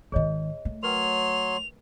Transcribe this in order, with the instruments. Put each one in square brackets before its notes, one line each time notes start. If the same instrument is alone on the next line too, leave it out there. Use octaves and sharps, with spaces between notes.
[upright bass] G#1 D#3 [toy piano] G#4 C#5 D#5
[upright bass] A3
[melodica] F#3 C#5 C6 [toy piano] A#4 B4 G5 [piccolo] F7